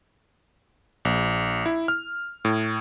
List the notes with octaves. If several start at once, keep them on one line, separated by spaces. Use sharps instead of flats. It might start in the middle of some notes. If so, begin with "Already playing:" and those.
A#1
E4
F6
A2